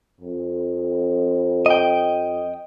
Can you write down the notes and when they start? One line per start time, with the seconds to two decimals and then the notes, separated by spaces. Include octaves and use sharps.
0.21 F2
1.66 D#5 G5